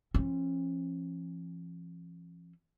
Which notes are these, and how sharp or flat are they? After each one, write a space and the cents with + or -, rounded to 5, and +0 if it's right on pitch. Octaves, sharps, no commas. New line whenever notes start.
F3 -40 C#4 -35